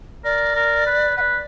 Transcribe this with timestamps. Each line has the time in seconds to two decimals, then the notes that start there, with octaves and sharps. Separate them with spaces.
0.24 A#4 D5
0.55 A#4
0.86 B4
1.17 B4 F#5
1.21 D5